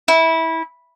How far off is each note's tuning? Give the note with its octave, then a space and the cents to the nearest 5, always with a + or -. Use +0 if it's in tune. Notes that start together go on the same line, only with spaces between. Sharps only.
E4 -20